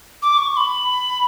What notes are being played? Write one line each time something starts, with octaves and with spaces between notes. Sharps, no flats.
D6
C#6
C#6
B5